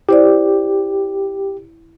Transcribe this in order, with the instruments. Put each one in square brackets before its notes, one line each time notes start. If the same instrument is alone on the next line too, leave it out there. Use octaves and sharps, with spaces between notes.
[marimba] E4 C5 D5 [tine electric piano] G4